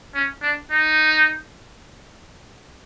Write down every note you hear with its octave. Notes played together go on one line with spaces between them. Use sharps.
C#4
D4
D#4